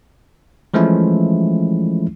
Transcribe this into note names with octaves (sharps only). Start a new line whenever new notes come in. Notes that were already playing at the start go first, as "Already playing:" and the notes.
E3 F3 G#3 A3 C#4 E4